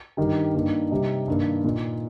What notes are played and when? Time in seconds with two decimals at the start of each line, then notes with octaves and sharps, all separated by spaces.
0.17 G2 D#3 G3
0.54 G2 D#3 A#3
0.91 C3 G3 D#4
1.28 G2 D#3 A#3
1.64 A#2 A#3 D#4